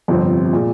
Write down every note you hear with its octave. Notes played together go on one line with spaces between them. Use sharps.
G1 F2 C3 F3 C4
A#2 G#3